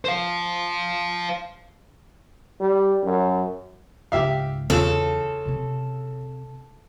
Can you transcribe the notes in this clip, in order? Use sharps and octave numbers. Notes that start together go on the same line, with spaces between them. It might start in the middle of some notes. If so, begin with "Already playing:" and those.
C5 F5
G3
F#2
C#2 G#2 G4 E5 F5
E2 C#3 F4 A4
C3 C4